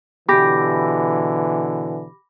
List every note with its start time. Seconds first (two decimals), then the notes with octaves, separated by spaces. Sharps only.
0.29 B2 D3 E3 G4 B5 D6 A#6